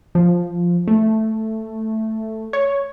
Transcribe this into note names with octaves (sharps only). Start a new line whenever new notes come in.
F3
A3
C#5